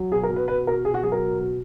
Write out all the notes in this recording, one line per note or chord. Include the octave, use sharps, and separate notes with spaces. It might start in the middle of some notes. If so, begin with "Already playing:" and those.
Already playing: F#3
B2 G#4
A#4
B2
B4
B2 B4
B2 A#4
B2 G#4
F#4
F#3 G#4
A#4
B2
B2